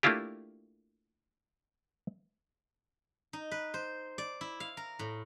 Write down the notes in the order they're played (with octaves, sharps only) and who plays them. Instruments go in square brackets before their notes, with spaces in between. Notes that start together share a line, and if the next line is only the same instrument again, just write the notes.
[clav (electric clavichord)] A3 A#3 D4 E4 F4 G4
[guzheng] D#4
B4
C5
D5
E4
F5
A#4
A2